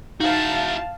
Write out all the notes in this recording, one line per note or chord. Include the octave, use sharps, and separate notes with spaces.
D#4 E4 F#4 F5 A5